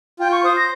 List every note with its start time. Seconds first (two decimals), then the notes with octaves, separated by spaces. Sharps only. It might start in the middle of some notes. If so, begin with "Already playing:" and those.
0.19 F4 G5
0.32 C#6
0.44 C5 D#6
0.57 A#6